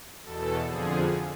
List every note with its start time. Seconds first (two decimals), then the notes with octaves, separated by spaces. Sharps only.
0.24 E2 B2 A4
0.67 F2 D3 F3 G#4